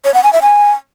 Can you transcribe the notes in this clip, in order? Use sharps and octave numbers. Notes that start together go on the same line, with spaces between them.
C#5
F#5
G#5
E5
G#5